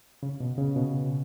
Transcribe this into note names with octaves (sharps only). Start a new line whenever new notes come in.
C#3
B2
C#3
B2